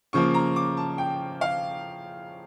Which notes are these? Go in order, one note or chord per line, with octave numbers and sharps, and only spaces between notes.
C#3 F3 A#3 C#6
A#5
D6
A5
G5
F5